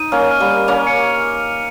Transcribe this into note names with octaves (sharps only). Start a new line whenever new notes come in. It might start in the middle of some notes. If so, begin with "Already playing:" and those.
Already playing: D#4 D#7
A#3 C#4 F6
F6
G3 A#3
F6
A#3 C#4 F7
C#7